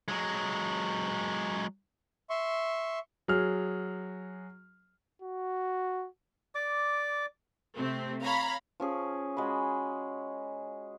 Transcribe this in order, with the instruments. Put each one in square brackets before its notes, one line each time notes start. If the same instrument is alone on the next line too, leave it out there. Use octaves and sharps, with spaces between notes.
[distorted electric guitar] F#3 G#3
[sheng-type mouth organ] E5 C6 C#6
[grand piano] F#3 G#4 F6
[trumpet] F#4
[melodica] D5 D6
[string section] C3 A3 C4
C#5 F5 A#5 B5
[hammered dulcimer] F3 C#4 G#4
G#3 F#4 B5